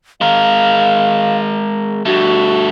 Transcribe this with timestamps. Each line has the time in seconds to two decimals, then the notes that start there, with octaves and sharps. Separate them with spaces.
0.21 G#3 A#4 F5
2.05 G2 A3 F#4